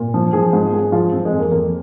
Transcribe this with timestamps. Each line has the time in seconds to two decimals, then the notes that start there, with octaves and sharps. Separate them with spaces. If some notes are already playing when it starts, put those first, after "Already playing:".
Already playing: A#2
0.14 F3
0.33 F3 G#4
0.53 G#2
0.73 G#2 G#4
0.92 F3 F4
1.12 F3 C4
1.25 G#3
1.32 F2
1.39 A#3
1.51 F2 A#3